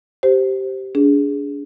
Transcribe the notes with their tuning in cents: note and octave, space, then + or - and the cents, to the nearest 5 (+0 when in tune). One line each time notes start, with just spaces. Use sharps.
G4 -15 C5 +0
D4 -35 G#4 +0